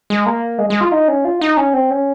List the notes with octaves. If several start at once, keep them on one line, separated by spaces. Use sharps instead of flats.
G#3
A#3
G#3
G#3
F4
D#4
C#4
F4
D#4
C#4
C4
C#4